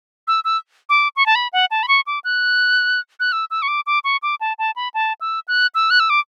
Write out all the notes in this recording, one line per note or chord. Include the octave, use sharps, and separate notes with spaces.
E6
E6
D6
C#6
A5
B5
F#5
A5
B5
C#6
D6
F#6
F#6
E6
E6
C#6
D6
D6
C#6
D6
A5
A5
B5
A5
E6
F#6
E6
F#6
E6
D6